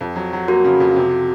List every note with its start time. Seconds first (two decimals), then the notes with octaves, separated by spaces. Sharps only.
0.01 F2
0.16 F#3
0.33 F#3
0.48 A#3 F#4
0.64 C#3
0.80 F2
0.96 C3